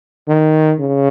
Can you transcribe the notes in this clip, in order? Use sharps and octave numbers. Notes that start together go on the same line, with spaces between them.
D#3
C#3